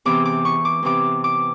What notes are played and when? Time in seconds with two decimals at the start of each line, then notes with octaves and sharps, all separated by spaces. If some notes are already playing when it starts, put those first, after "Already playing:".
0.05 E2 C3 E3 D6
0.25 D6
0.45 C#6
0.65 D6
0.83 E2 C3 E3 D6
1.24 D6